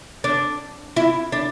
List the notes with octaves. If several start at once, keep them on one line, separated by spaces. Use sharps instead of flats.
D4
E4
D4